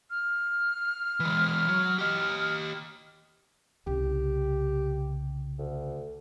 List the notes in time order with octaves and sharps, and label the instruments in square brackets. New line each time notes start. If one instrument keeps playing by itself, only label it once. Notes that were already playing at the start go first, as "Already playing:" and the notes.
[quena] F6
[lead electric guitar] E3 G#3
F#3
G4 D#5
[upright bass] C2 C#3 [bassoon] G4
[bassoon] D2